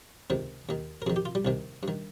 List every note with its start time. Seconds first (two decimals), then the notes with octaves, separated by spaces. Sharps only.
0.30 C#2 C3 D#3
0.69 D#2 D#3
1.02 A#4
1.06 F2 G#4
1.10 D#3
1.16 G4
1.25 F4
1.35 G3
1.45 C2 C3 D#3
1.83 G2 D#3